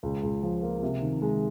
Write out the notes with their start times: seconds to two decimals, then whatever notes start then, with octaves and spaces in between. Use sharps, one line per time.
0.03 C#2
0.23 C#2
0.43 F3
0.63 A#3
0.83 C3
1.02 D#3
1.22 G#3